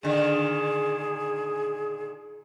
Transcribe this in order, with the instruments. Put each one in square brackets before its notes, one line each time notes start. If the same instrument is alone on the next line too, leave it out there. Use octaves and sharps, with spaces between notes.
[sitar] A#2 D3 D#3 [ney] G#4